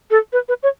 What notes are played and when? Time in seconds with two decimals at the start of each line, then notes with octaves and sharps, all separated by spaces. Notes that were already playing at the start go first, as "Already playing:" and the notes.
0.11 A4
0.33 B4
0.48 B4
0.63 C#5